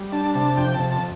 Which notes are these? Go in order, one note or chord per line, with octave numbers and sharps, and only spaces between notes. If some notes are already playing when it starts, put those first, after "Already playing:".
Already playing: G3
D4 A5
C3 A5
F2 G5
A5
C3
A5